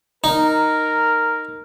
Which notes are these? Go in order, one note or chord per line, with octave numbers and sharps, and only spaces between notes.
D#4 A#4